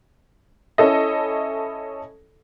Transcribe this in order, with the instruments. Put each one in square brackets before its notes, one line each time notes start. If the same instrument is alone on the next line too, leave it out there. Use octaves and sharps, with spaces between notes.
[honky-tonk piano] C#4 E4 A4 D#5